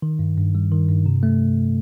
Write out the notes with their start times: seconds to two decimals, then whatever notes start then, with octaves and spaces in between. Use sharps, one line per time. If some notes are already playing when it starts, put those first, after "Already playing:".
0.02 D#3
0.19 G2
0.37 G2
0.55 G3
0.72 D#3
0.89 G2
1.06 C3
1.23 A3